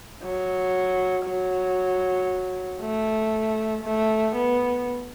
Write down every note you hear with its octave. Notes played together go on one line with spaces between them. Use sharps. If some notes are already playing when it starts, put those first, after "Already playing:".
F#3
F#3
A3
A3
B3